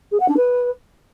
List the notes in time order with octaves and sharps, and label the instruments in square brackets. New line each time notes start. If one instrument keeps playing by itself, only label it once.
[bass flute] G#4
F#5
D4
B4